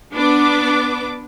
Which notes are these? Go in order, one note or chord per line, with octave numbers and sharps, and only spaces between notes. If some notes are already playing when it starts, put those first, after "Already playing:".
B3 D4 B4 D6